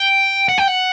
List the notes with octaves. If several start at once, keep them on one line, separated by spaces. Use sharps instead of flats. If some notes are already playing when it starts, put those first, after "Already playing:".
Already playing: G5
F#5
G5
F#5